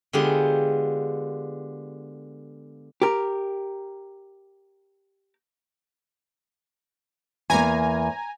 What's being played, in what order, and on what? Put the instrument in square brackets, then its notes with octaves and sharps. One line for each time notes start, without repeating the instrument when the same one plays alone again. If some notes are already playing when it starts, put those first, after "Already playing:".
[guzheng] D3 G#3 B3 F4 G4
[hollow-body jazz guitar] G4 A#4
[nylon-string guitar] E2 A#3 [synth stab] G#5 A#5